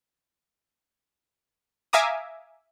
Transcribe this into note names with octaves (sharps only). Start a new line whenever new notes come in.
E5 F5 G#5 A#5 D6 D#6